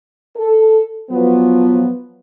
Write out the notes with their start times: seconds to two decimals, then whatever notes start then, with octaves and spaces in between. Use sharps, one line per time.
0.36 A4
1.11 F3 F#3 B3